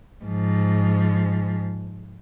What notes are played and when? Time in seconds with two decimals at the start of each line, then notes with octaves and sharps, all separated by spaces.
0.25 G#2 F3